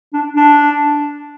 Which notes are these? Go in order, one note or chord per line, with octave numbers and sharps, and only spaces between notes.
D4
D4